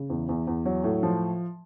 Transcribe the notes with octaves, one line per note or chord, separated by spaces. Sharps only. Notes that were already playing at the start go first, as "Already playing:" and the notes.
Already playing: C#3
E2
E2
E2
F#3
A2
F3